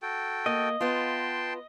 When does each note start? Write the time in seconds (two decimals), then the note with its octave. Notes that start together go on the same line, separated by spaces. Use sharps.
0.02 F#4 A4 G5
0.46 A#3 D#5
0.81 B3 F4 G5 A5 C6